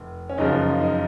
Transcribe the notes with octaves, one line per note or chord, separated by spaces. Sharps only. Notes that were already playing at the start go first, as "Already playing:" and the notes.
Already playing: F1
C#4
F#1 F#2 C#3 F3 D#4
D#4